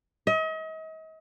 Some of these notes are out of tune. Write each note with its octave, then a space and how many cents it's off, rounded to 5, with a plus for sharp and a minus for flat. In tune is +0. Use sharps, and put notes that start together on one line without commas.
D#5 +40